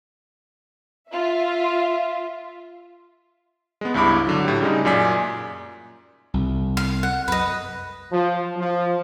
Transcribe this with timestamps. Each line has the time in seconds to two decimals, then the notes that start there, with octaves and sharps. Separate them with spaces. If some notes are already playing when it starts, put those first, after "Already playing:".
1.09 F4 E5
3.81 G#3 B3
3.94 C#2 G2 E4 B5 D6
4.27 D3 F#3
4.45 A2 G4
4.61 C#3 G3 G#3 D#4
4.85 F#2 A#2 D5 G#5 B6
6.34 C2
6.77 F5
7.03 F#5
7.28 F#2 B4 D#5
8.12 F3
8.57 F3